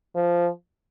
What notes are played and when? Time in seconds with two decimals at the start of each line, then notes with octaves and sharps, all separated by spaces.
0.15 F3